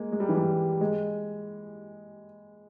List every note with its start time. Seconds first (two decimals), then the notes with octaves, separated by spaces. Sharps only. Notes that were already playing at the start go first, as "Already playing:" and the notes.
Already playing: G#3 A#3
0.12 G#3
0.20 G3
0.28 E3
0.36 G3
0.81 G#3